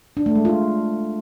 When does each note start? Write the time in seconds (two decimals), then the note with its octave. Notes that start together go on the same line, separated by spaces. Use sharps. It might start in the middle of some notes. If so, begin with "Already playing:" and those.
0.17 D4
0.26 A3
0.35 G#3
0.45 F4